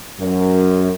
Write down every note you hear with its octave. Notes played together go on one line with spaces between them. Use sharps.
F#2